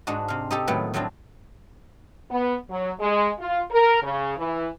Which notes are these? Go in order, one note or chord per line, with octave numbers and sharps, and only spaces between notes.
G#2 D4 D#4 F#4
C3 F5
D#4 G4 A4
A2 D#3 F#3 A3 B3
F3 F#3 A3 C4 D4
B3
F#3
G#3
F4
A#4
C#3
E3